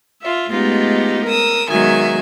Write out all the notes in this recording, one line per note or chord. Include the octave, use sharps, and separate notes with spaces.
F4 E5
G#3 A3 B3 D#4 F4 G4
A#4 D#6 E6
D#3 F#3 G#3 B3 E5 G#5